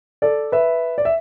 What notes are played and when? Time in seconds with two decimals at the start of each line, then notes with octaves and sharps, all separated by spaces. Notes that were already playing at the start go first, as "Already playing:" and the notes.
0.22 A4 D5
0.52 B4 E5
0.98 D5
1.05 E5